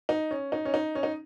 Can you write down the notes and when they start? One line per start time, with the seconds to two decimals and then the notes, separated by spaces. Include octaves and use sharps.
0.09 D#4
0.31 C#4
0.52 D#4
0.65 C#4
0.74 D#4
0.95 C#4
1.03 D#4